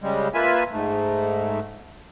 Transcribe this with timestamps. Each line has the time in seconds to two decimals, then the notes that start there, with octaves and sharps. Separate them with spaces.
0.03 C#3 G3 G#3
0.34 A#3 F4 B4 E5 G#5
0.72 G#2 A3